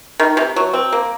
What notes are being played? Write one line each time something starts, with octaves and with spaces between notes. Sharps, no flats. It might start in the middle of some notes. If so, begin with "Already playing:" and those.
D#3
C3
F#3
C4
A#3